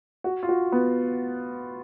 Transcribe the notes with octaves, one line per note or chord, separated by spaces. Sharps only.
F#4
F4
F#4
B3